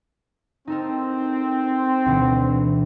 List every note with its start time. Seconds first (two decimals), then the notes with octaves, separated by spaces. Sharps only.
0.67 C4 D#4 A4 A#4
2.06 D2 B2 E3